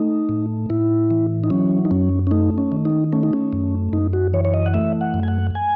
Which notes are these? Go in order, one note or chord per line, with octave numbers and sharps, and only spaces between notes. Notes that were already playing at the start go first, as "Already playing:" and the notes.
Already playing: A3 D#4
A2
A2 E4
E3
D#4
F#3 C#4
D#4
F#2 C#4
C#4
A3 D#4
C#4
D#3
D#4
A3 C#4
D#4
C#4
F#2
F#2 D#4
F#4
E3 C#5
C#5
D#5
F#5
A3 E5
F#5
F#2
G#5
F#5
G#5